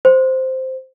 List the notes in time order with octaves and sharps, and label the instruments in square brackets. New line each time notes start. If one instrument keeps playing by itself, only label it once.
[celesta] C5